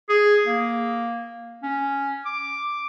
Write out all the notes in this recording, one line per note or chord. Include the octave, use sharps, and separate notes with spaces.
G#4
A#3
C#4
D6